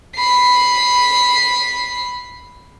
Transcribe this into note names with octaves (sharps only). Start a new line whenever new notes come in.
B5 C7